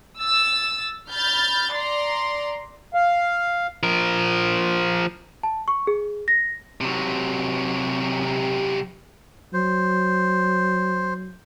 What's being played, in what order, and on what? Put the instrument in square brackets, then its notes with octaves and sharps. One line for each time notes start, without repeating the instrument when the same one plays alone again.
[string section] E6 A6
B5 F6 G6 A6
D5 A#5 C6
[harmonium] F5
[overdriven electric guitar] F3 A#4
[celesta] A5
C#6
G#4
A#6
[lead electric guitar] C3 F#3
[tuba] F#3 [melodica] C5